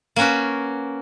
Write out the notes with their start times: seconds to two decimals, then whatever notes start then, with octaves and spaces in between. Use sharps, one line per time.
0.16 A#3 C#4 F#4 B4